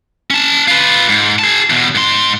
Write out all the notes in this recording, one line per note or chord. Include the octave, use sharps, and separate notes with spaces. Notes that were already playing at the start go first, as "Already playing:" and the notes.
C#4 A5
F4 B4
G#2
G#4 A5
E2 B2
G#2 C6